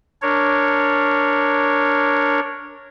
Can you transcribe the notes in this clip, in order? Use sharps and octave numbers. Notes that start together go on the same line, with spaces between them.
D4 A#4 C#5